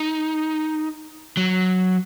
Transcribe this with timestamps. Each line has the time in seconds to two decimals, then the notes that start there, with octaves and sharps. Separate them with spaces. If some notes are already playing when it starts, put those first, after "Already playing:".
Already playing: D#4
1.37 F#3